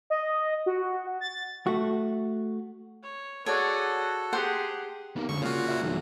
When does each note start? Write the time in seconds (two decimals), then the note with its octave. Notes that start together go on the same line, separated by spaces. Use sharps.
0.10 D#5
0.66 F#4
1.21 A6
1.67 A3 F#4
3.02 C#5
3.46 F#4 G#4 A4 C#5 D5 F#5
4.33 G4 G#4 C5 F#5
5.16 D#2 B3 A#4
5.29 D2 D3 G#3 C#6
5.41 A#2 C#3 F4 F#4
5.68 F4 E5
5.82 B1 G2 E3